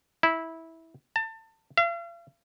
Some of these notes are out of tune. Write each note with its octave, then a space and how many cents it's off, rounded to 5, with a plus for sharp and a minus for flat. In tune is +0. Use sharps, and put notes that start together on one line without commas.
E4 -15
A5 +30
F5 -45